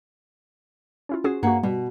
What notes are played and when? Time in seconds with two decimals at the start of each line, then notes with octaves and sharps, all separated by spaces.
1.09 C#4 E4 F4
1.24 C#4 F#4 G#4 C5
1.43 G2 A#3 F#4 C#5 F#5
1.63 B2 G3